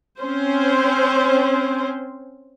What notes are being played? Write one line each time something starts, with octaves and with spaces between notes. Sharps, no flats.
C4 C#4 C5